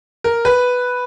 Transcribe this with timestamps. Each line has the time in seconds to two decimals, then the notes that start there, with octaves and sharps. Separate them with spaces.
0.24 A#4
0.45 B4